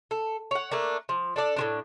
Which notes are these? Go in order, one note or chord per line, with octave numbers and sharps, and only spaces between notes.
A4
C#5 F#5
A3 A#3 D4
F3
D4 A4 D5
A2 F3 D4